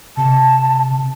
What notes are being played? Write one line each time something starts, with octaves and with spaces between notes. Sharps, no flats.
C3 A5